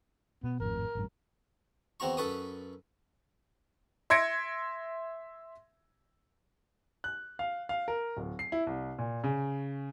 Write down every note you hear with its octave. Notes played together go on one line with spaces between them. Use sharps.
B2 B3
G#1 F2 A2 A#4
A1 G2
E2 C4 F#4 A#5 C#6
F#2 A4 B4 C#6 D#6
E5 C6 G#6 A#6 C#7 D7
F#6
F5
F5
A#4
D1
C7
E4
C2
A#2
C#3